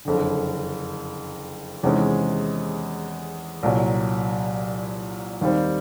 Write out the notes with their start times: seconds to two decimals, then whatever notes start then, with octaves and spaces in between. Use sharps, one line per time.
0.05 F#1 F2 D3
1.83 E2 C3 D#3 G#3 C#4
3.63 C2 A#2 F#3
5.41 D#2 D#3 G3 C4